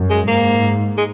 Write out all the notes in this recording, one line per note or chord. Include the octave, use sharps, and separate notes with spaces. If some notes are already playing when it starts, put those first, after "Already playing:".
Already playing: F#2
G#3
G#2 A#3
G#3